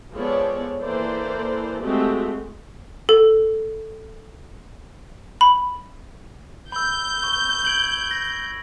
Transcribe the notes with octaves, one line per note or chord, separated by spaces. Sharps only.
F3 G#3 B3 A4 C#5 D5
E3 A#3 A4 C5 D5
G#3 A3 C4 F#4 G4
A4
B5
B5 E6 G6
C#6 G7
G#6 D7 F#7
A#6